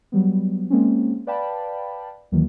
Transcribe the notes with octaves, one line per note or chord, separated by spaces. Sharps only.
F#3 G3 B3
G#3 A#3 C4 C#4
B4 D5 F5 G5 A5 B5
D#2 D#3 E3 F#3 A#3